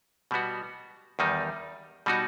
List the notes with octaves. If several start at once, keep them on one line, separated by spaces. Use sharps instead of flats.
B2 G3 B3 F#4
E2 D#3 G3 D#4
B2 G3 D#4 F#4